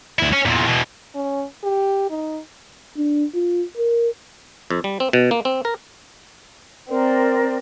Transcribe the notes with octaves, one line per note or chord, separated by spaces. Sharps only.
D2 E4
C#4
E2 A#2
B2 E3
C#4
G4
D#4
D4
F4
A#4
F2
G3
C4
B2
A#3
C4
A#4
C4 A#4 D5